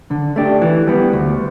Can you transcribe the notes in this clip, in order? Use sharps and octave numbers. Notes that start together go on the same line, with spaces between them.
D3
A3 D4 G4
E3
G3 B3
D2